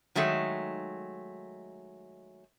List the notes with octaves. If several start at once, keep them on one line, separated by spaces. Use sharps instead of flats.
D#3 F#3 G#3 A3 D#4